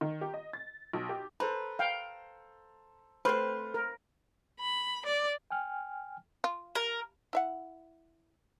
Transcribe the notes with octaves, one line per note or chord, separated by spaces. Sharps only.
D#3
G4
D#5
A6
B1
G4
A4 B4 C5 A#5
F5 G5
A3 C4 B4 C5 C6 F6
A#4
B5
D5
G5 G#5 F6
F4
A#4
E4 E5 F#5